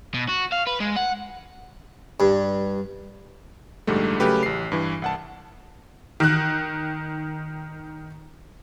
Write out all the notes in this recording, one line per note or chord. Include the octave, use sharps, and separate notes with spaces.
B2
F#4
F5
B4
G#3
F#5
G2
A#1 G#2 D3 G3 A3
C#3 F#3 A3 G4 B4
A1 C7
G2 E3
C2 F#5 A5
D#3 F#6